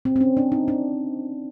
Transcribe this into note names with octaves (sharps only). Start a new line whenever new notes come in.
C4
C4
C#4
D4
D#4
D4